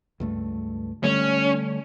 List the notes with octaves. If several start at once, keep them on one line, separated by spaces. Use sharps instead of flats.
C#2 G2 A3
D3 G3 A3 C#4